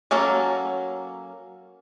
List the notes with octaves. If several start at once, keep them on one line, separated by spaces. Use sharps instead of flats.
F#3 A#3 C#4 A4